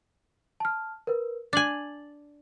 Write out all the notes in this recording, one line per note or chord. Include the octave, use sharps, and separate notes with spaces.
A5 F6
A#4 B4
D4 G#5 A6 F#7